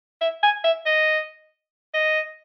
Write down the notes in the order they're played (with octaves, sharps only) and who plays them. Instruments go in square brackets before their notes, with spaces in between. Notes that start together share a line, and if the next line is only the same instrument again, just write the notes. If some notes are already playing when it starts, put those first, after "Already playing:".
[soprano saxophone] E5
G#5
E5
D#5
D#5